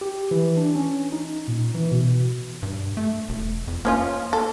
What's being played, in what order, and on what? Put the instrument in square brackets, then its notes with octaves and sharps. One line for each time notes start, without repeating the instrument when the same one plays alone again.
[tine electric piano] G4
E3
D4
C#4
D#4
A#2
E3
B2
[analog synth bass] G2
A3
E1
F2
[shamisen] F3 C#4 F4 [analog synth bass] A#3
[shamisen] A4